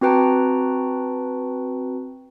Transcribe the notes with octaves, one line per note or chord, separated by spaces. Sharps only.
C4 F#4 B4 G5 A5 A#5